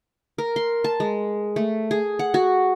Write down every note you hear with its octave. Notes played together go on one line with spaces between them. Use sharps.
A#4
C6
A5
G#3
A3
G#4
F#5
F#4